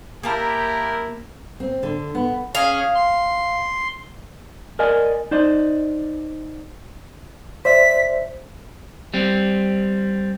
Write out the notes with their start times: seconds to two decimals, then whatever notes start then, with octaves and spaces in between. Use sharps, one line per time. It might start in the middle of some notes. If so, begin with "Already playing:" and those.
0.23 A#3 E4 G4 A#4 A5 A#5
1.60 C4
1.83 D3
2.15 B3
2.55 C#4 G#4 F5
2.95 C6
4.79 A#4 D5 D#5 G#5
5.31 D#4 C5 D5 D#5
7.65 C5 D5 E5 B6
9.14 G3 C4